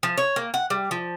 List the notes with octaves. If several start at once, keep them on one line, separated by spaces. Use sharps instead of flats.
F3
C#5
A#3
F#5
G3
F3